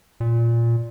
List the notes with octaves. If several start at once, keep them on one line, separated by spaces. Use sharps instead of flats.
A#2